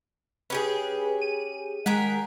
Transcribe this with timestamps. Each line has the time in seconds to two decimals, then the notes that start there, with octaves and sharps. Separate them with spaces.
0.50 C#4 G4 G#4 B4
1.21 D#7
1.86 D#3 G#3 G#4 A#4 F#5 B6